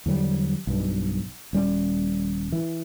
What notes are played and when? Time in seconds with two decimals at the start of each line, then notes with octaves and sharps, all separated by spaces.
0.06 E2 D3 F#3 G3
0.67 B1 G2
1.53 D#1 G3 C#4
2.52 E3